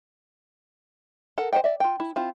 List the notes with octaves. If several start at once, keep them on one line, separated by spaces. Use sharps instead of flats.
A4 A#4 F#5
C5 C#5 D#5 F#5 G5
D5 E5
F4 G5
E4
C4 E4 F4